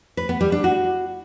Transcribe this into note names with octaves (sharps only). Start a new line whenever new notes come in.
B4
B3
G3
D4
F#4